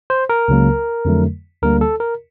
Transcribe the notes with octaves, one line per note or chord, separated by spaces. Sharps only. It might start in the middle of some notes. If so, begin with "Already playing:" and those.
C5
A#4
C#2 C#3 F#3 A#3
F2 D3 F#3 A3
D2 D3 G3 A#3 A#4
A4
A#4